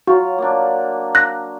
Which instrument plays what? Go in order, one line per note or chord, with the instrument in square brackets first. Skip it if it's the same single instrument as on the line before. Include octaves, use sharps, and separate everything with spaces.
[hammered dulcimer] F#3 F4 [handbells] F#4
[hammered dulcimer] A#3 D4
[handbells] F#6 A#6